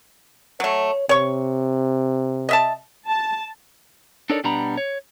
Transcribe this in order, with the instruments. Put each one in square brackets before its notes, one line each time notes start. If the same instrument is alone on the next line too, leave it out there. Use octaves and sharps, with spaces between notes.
[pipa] F#3 A3 [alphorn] C#5
[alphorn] C3 [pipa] C#5 C#6
[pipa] D#5 E5 A5
[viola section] A5
[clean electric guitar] D4 D#4 A4 A#4 C#5 D5
B2 G3 B3 D4 A#5 B5
C#5